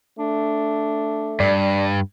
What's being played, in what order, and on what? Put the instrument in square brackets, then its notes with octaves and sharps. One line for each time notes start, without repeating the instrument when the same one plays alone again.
[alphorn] A3 [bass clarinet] D4
[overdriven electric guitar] G2 [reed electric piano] D5